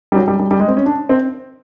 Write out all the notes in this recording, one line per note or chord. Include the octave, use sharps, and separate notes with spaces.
G3
F#3
G3
G3
G3
G#3
C4
C#4
D4
C4